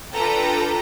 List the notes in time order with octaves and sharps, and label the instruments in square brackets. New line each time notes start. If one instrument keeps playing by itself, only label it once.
[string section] D4 F4 A4 B4 G5 A#5